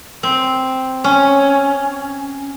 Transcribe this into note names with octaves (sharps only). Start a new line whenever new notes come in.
C4
C#4